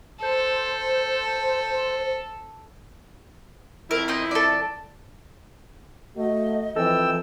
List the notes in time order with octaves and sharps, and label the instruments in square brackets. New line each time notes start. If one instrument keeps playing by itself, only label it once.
[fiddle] A4 [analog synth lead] C5
[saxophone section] F2 E4 [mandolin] A#4
[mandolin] C4 D#4 D#5
A4 D5
[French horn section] A3 F#4 [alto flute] D#5
[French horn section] E3 C4 [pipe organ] F3 G5 E6 [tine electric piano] A4